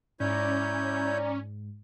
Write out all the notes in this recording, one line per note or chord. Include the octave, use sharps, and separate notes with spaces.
G#2 C#4 E4 C#5 D5 A#5 G6